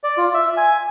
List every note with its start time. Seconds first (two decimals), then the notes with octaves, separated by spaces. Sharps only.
0.04 D5
0.17 F4
0.34 E5
0.57 G#5